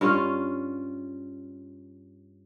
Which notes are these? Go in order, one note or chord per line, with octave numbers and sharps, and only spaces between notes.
G2 C#4 F4